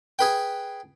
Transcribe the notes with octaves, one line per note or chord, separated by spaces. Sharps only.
G#4 B4 G5